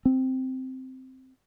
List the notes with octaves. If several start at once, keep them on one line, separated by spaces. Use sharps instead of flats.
C4